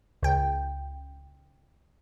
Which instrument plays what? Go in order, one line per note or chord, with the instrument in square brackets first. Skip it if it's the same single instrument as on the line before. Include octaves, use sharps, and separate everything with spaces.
[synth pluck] C#2 G5